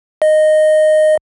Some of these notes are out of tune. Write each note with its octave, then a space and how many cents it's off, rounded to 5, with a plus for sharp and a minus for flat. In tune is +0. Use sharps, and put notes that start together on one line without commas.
D#5 -10